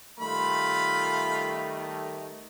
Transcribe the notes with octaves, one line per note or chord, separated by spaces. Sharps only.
D#3 G3 A3 F4 B5